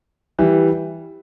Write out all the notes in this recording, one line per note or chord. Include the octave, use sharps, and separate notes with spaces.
E3 G3